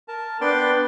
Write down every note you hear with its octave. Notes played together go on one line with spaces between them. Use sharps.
A#4 A5
B3 D4 B4 D5 G5 C6